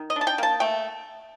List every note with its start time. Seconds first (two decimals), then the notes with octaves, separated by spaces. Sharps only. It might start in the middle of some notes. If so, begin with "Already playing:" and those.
Already playing: D#3
0.10 D#5
0.16 D4
0.21 A5
0.27 G5
0.38 A#3 A5
0.60 A3 G5